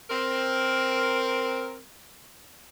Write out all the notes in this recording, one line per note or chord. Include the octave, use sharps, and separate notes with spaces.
C4 A#4